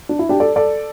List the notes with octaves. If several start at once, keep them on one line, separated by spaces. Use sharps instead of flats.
D4
E4
D4 G4
A4 D5
A4 D5